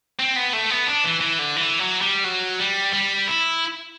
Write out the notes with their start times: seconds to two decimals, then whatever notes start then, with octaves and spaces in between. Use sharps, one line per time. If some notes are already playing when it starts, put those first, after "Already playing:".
0.19 C4
0.36 B3
0.53 A3
0.70 B3
0.87 D4
1.04 E3
1.21 E3
1.39 D3
1.56 E3
1.79 F#3
2.01 G3
2.24 F#3
2.59 G3
2.93 G3
3.27 E4